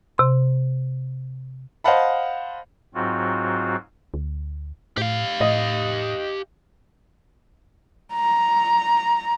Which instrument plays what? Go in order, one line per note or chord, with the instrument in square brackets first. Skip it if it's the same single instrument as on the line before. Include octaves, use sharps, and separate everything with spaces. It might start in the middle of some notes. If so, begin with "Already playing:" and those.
[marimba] C3 C6
[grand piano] C5 D#5 F5 F#5 A5 B5
[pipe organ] G#2 F#3 C4 F4 F#4
[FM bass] D2
[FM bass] A2 [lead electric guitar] G4 F5
[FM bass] A2 [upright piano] D#5
[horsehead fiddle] A#5